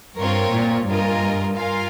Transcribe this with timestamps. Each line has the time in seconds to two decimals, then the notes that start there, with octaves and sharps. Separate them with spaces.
0.18 G2 C4 F4 A#4 C#5
0.52 A#2
0.87 G2 F4 A#4 D#5 G#5
1.55 F4 A#4 F5 G#5